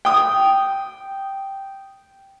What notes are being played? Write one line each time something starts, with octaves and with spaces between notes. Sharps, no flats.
G5 D#6